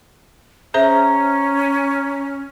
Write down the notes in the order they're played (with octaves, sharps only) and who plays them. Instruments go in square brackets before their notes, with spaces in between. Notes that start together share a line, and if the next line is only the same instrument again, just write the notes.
[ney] C#4 [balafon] G#4 C5 E5 [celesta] A#5